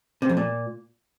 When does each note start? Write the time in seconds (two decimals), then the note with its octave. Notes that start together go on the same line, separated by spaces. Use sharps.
0.22 C3
0.29 F2
0.37 A#2